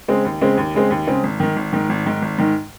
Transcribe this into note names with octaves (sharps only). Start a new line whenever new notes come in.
C#3 G#3 C4
D#2
C#3 G#3 C4
D#2
C#3 G#3 C4
D#2
C#3 G#3 C4
G#1
G#2 D#3
G#1
G#2 D#3
G#1
G#2 D#3
G#1
G#2 D#3